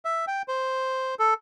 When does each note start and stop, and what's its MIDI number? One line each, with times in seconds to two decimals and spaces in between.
0.05 0.25 76
0.27 0.42 79
0.48 1.15 72
1.19 1.34 69